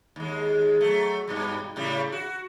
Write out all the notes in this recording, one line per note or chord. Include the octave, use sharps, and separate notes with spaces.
D#2 G#3
F#3 A3
G2 B2 G3
A2 C#3 G3
F#4